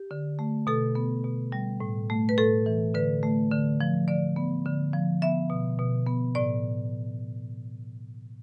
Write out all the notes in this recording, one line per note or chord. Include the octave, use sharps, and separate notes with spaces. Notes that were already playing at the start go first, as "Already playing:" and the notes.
Already playing: G4
D3
A3
B2 A4
B3
B2
G3
A2
A3
B4
A2 A4
E3
D3 B4
A3
D3
F3
D3 D5
B3
D3
F3
B3 E5
B2
B2
B3
A2 D5